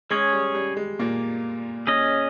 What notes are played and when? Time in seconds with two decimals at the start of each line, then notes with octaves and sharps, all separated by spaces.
0.10 G#3 C#4 G#4 C#5
0.33 G3
0.55 G3
0.77 G#3
0.99 A#2 A#3
1.87 C#4 G#4 D#5